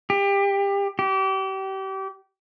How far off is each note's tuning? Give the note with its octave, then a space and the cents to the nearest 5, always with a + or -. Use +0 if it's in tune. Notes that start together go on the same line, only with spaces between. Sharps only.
G4 +25
G4 -30